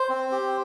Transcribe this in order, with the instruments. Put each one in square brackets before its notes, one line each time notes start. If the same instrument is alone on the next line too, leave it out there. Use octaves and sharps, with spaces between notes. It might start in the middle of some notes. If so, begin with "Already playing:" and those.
Already playing: [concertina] C5
C4
G4